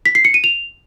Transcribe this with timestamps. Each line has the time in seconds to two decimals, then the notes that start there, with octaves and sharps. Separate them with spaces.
0.06 B6
0.15 C7
0.25 C#7
0.34 D#7
0.44 F7